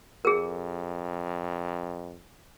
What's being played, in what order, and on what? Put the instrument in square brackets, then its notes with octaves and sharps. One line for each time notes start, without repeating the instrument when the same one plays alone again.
[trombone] F2 [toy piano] G#4 A#4